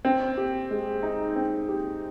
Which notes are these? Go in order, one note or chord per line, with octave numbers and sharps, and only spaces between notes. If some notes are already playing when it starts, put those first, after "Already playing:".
C4
G4
G#3
D#4
C4
G4